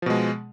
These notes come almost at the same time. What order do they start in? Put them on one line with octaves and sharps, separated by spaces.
F3 B2 G#3